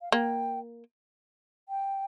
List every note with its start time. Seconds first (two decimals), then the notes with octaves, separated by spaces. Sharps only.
0.02 F5
0.12 A#3 G5
1.69 G5